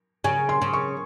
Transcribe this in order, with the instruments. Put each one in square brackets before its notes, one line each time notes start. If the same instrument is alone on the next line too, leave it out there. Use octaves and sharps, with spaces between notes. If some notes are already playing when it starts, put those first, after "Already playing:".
[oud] C#3 [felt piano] G#5
[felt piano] C6
[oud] C#3
[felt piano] C#6